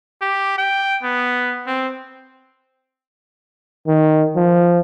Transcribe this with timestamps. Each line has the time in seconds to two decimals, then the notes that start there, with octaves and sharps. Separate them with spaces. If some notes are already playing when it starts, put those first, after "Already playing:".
0.22 G4
0.58 G5
1.03 B3
1.67 C4
3.88 D#3
4.36 F3